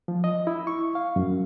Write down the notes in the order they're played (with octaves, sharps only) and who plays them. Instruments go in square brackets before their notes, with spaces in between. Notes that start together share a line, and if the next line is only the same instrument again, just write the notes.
[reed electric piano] F3
D#5
E4
C#6
F5
F#2